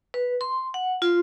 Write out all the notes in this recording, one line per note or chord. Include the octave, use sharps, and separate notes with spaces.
B4
C6
F#5
F4